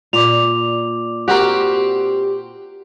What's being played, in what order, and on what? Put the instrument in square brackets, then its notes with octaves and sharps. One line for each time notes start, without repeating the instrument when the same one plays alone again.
[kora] A#2 [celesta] D5 D6 F7
[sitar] C4 G4 [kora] F#4 A#4